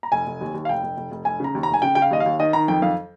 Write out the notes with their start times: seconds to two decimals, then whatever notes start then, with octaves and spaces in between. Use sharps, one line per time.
0.03 A#5
0.12 F1 G#5
0.27 F1
0.41 D#2
0.54 D#2
0.65 F5
0.69 F1 G5
0.83 F1
0.97 F1
1.11 F1
1.25 F1 G#5
1.40 C#3 A#5
1.55 D#2
1.63 A#5
1.69 F1
1.74 G#5
1.82 C#3 G5
1.95 C#3 G5
2.02 F5
2.11 D#2 D#5
2.20 F5
2.26 D#2
2.40 D#3 D#5
2.53 D#3 A#5
2.68 F2 G5
2.82 F2 F5